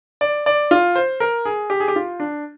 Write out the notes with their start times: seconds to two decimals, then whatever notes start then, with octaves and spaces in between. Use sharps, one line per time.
0.21 D5
0.46 D5
0.71 F4
0.95 C5
1.20 A#4
1.45 G#4
1.70 G4
1.80 G#4
1.88 G4
1.96 F4
2.20 D4